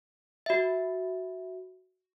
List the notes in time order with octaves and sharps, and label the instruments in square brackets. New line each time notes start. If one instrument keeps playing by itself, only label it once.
[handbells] F#4 E5